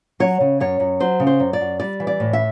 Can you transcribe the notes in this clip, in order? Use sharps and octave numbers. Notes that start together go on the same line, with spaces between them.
F#3 C#5
C#3
F#2 C#5
F#2
F#3 C5
C#3
C5
F#2
D5
F#2
G3 D5
E3
D5
A2
E5